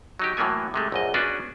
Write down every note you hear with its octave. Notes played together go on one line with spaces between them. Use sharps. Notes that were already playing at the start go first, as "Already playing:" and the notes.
F#3 D#4 G4
A2 E3 F#3 A#3 B3 G#5
C3 G#3 A3
A#1 F#2 D#5
B3 C#4 D4 F#4 G#4 B4